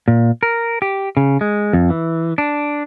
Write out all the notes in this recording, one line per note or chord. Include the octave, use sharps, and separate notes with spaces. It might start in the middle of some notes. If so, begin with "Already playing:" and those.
A#2
A#4
G4
C#3
G#3
F2
E3
D4